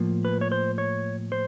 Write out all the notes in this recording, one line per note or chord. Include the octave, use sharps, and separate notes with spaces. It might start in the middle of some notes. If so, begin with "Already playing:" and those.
Already playing: A2 F3 A#3
B4
C#5
C5
C#5
C5